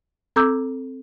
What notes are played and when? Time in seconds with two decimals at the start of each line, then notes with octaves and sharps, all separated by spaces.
0.36 C4 A4 A#5 D6 E6 G6